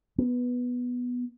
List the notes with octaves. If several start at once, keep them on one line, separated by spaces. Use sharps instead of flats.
B3